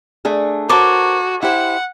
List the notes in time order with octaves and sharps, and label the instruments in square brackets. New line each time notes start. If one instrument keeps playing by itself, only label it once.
[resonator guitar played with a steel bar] A3 D4 G#4
[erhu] F#4 [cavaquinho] A4 C#5 D6 [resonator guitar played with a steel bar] A#4 C5
[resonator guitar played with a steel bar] E4 G4 C5 [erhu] F#5